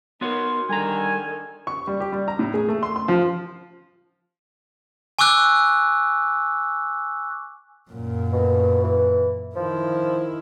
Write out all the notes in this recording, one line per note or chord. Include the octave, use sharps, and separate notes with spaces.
B3 D#4 F#4 A#4 C#5 C6
D3 D#3 G3 G#5 A#5
C#6
G3
G4
G3
A#5
A2
G#4
A3
C6
C6
F3
G#5 C#6 D6 E6 F#6
F#2 A#2
B2
E3
D#3 F3 E4